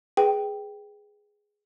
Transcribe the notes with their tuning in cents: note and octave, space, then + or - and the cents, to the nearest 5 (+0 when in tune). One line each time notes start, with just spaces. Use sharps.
G#4 +0 B4 +0 G5 +0